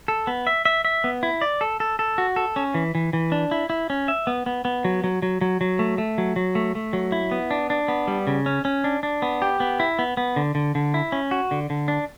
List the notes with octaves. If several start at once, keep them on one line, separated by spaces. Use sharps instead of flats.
A4
B3
E5
E5
E5
B3
E4
D5
A4
A4
A4
F#4
A4
C#4
E3
E3
E3
D4
E4
E4
C#4
E5
B3
B3
B3
F#3
F#3
F#3
F#3
F#3
A3
A3
F#3
F#3
A3
A3
F#3
E4
B3
D4
D4
B3
G3
C#3
C#4
C#4
D4
D4
B3
G4
B3
E4
B3
B3
D3
D3
D3
E4
C#4
F#4
D3
D3
D4